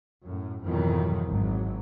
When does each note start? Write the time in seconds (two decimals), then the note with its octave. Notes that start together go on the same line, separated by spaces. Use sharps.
0.24 F#2 A2
0.63 F2 G#2 B2 D#3 E3 F#3
1.30 G#1 F#3